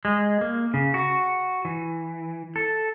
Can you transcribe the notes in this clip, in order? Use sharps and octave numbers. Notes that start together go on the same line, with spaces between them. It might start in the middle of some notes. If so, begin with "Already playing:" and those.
G#3
A#3
C#3
F#4
E3
A4